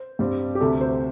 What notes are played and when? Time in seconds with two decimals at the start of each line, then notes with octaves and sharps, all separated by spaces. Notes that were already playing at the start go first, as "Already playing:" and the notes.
Already playing: C5
0.19 G2 G3 C4
0.55 G4
0.60 D2 C3 A3 A4
0.81 C5